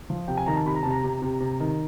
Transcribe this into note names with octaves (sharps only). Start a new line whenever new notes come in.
F3
C3 G5
G#5
D#3 A#5
A5
C3 B5
A#5
C3 A5
A#5
C3
C3
C3
D#3